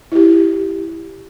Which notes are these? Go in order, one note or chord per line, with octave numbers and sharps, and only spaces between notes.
E4 G4